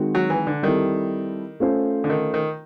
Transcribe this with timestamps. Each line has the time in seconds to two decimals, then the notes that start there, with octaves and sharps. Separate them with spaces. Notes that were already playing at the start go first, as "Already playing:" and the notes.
Already playing: D#3 G#3 C4 D#4 F#4
0.15 F#3
0.30 E3
0.47 D3
0.63 D#3 G3 C4 E4 A4
1.60 A3 C#4 F4 A4 C5
2.04 D3
2.10 D#3
2.34 D#3